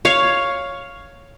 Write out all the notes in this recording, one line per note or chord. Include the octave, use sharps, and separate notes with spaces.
C#5 F5